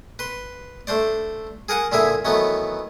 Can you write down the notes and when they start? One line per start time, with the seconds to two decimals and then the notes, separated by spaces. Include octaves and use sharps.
0.19 B4 C6
0.87 A3 D4 C5 D5
1.69 G#4 A#4 F#5 G#5
1.92 A#2 D3 A#3 E4 G#4 E5
2.25 D#3 E3 F#3 A3 B3